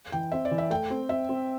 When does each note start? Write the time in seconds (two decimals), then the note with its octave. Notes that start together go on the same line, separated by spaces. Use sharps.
0.12 E3 G5
0.32 C4 E5
0.45 D5
0.51 E3
0.58 E5
0.70 A3 G5
0.90 C4
1.09 C4 E5
1.29 C4